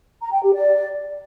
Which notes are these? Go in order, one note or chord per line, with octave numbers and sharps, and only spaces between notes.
A#5
G5
G4
D5